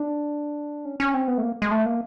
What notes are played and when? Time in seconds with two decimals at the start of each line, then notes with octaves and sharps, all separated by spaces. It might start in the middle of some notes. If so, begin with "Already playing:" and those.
Already playing: D4
0.85 C#4
1.00 C#4
1.14 C4
1.28 B3
1.38 A3
1.42 A#3
1.62 G#3
1.71 A3
1.86 A#3